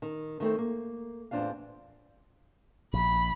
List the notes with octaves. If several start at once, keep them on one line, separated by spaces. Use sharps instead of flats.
D#3
D#3 A3 C4
A#3
E2 A2 C4 D4 F4 F5
A#1 B5